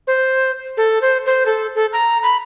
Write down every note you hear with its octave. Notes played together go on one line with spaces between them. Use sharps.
C5
A4
C5
C5
A4
A4
A#5
B5